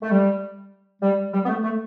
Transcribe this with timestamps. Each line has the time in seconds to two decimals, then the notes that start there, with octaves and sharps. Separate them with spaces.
0.03 A3
0.11 G3
1.02 G3
1.33 G3
1.45 B3
1.49 A3
1.64 A3